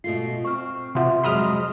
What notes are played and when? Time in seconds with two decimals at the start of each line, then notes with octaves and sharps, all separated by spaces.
0.04 B2 A3 F4 C7
0.45 C4 C#6 F6
0.95 C3 F3 E5 F#5 C6
1.24 F2 F#3 G#3 B5 D#6 F6